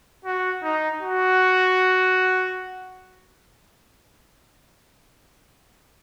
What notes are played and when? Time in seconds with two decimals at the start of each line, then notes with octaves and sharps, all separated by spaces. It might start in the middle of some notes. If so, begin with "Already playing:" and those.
0.25 F#4
0.63 D#4
1.00 F#4